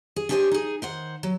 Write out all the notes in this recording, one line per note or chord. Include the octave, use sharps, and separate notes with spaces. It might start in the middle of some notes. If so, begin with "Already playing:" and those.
G#4
D4 G4 G#4 A#4 C5 C#5
D#4 G#4
D#3 C5 F#5
F#3